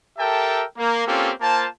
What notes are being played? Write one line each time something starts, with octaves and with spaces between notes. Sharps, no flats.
G4 A4 A#4 E5 G5 A5
A#3
A#3 C4 C#4 F4 G4 A4
A#3 F4 C5 A5